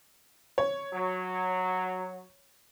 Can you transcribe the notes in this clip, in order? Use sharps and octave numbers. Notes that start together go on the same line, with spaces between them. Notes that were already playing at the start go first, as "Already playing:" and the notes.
C#5
F#3